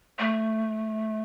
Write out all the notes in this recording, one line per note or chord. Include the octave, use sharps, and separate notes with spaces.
A3